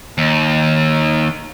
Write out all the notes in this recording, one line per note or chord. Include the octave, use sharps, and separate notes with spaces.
D#2